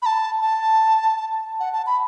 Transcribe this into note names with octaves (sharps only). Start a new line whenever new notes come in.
B5
A5
A5
F#5
A5
B5